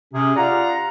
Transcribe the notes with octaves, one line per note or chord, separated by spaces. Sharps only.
C3 C#4 G#4
F4 G4 D5 F5 F#5 A#5